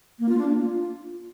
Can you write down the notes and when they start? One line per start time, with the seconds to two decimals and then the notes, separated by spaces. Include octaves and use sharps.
0.19 A#3
0.29 F4
0.38 D4
0.48 A#3
0.57 F4